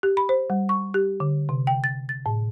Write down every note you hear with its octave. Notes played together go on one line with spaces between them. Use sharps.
G4
B5
C5
G3
C#6
G4
D3
C3
G5
A6
A6
A2